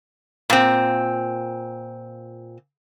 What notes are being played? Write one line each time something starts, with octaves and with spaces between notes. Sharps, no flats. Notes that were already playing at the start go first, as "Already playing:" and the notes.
A#2 C4